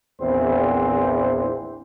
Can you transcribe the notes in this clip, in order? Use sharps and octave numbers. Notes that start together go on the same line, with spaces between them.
A#1 E2 E3 C4 C5